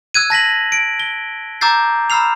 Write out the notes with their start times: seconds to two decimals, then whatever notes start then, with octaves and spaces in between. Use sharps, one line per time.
0.14 E6 F#6 G#6 D#7
0.30 A5 A#6 B6 F#7
0.72 D7
1.00 G7
1.61 A#5 D6 E6 G6 A6 C7
2.10 A#5 B5 E6 F6 C7 F7